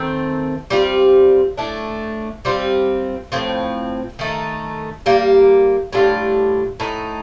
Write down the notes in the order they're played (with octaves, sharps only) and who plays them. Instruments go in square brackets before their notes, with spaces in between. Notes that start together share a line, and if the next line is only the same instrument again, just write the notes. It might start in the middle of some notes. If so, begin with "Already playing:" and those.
Already playing: [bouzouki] D#3 A3 C4
G3 C4 F4
A2 A3 D4
G3 C4 F4
A2 F3 C4
D#3 A3 D#4
G3 A#3 F4
A2 G3 D4 F4
A2 A3 D#4